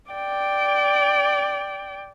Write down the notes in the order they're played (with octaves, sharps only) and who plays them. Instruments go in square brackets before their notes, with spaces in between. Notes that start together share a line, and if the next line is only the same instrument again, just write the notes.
[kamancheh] D5 G5